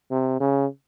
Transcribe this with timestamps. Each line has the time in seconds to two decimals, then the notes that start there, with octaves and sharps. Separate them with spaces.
0.11 C3
0.40 C#3